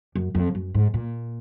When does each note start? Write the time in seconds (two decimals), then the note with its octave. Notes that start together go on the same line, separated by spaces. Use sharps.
0.15 F#2
0.35 F2
0.55 F#2
0.74 G#2
0.94 A#2